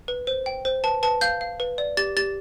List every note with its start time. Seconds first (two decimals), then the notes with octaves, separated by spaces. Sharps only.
0.08 B4
0.27 C5
0.46 G5
0.65 C5
0.84 B4 A5
1.03 B4 A5
1.21 F5 G6
1.41 F5
1.60 B4
1.78 D5
1.97 G4 A6
2.17 G4 A6